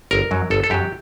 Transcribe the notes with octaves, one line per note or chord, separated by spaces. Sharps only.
G1 A#4
F#2 F#3
G1 A4
A4
F#2 F#3 G4